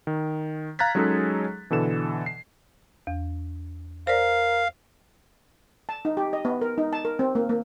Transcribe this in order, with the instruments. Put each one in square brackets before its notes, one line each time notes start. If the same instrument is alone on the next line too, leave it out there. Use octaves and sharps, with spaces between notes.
[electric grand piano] D#3
F5 A#5 F#6 G#6 A6 B6
F#3 G#3 C#4 D#4 G#4 A4
B2 D3 E3 A4 E7
C7
[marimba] E2
[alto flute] A#4 [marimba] C5 D5 [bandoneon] F5
[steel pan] A5
D#4
G4
D#5
B3
A#4
D#4
A5
A#4
C4
A#3
A#3